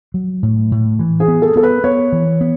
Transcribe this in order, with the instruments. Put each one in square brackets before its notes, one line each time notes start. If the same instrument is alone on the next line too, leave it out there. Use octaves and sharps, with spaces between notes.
[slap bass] F#3
A2
A2
E3
[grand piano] G#4
[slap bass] B3
[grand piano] A4
[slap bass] B3 [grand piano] A4
[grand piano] B4
[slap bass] B3 [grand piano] C#5
[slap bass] E3
B3